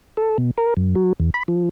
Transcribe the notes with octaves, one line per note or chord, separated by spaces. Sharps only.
A4
B2
A#4
F#2
F#3
E2
B5
F3